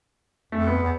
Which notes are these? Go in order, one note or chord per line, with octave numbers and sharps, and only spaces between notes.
F2 A3
B3
E2